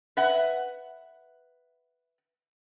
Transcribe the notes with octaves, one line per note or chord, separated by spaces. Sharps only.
B4 E5 F#5